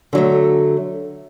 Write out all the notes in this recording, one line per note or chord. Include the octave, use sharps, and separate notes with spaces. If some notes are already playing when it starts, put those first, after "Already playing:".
D3 F#3 A3